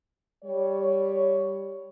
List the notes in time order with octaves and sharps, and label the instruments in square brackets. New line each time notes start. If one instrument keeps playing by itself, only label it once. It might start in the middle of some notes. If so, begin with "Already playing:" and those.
[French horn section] G3 C#5